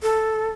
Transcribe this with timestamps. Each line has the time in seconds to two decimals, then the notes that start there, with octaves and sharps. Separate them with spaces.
0.03 A4